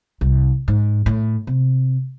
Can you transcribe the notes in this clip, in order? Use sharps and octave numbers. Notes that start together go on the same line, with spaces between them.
C2
G#2
A2
C3